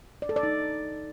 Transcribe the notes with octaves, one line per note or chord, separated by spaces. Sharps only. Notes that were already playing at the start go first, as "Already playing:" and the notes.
D5
A4
D5
D#4